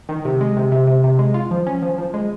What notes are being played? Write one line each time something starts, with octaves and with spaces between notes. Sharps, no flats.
D#3
C3
G#3
C3
C3
C3
C3
G#3
F4
F3
C#4
F3
F3
G#3